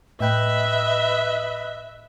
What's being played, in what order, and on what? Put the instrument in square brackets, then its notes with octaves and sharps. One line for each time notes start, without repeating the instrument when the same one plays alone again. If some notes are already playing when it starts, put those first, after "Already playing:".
[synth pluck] A2 G5 [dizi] B4 [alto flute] D#5 [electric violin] E5